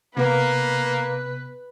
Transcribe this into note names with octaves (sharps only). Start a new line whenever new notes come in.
C3 A#3 B3 B4